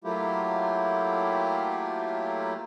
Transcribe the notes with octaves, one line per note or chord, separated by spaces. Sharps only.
F#3 A3 A#3 E4 F4 G4